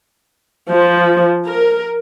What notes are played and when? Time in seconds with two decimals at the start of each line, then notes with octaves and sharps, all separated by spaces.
0.70 F3
1.47 A#4